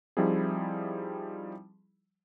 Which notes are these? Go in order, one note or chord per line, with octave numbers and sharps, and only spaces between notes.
F3 G3 C4 D#4 E4 G#4